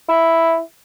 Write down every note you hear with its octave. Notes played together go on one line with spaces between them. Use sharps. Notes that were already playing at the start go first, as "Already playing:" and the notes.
E4